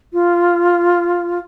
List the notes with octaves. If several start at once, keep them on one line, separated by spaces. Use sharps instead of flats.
F4